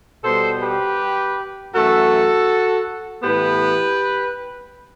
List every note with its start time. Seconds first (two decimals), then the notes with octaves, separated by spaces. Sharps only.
0.23 B2 G3 B3 A4 C5
0.61 G4 B4
1.74 F#2 E3 A3 F#4 A4
3.23 A2 E3 B3 G4 B4